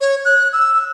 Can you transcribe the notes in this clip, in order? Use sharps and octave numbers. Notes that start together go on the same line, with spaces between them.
C#5
F#6
E6